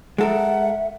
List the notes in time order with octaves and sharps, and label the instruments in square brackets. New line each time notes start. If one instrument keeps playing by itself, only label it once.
[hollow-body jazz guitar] G#3 A4 A#4 [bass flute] E5 [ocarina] F#5